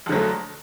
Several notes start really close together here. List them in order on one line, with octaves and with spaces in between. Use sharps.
F2 D3 F#3 A3